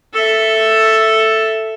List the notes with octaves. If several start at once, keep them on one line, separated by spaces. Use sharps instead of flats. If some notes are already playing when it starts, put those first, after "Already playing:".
A4 E5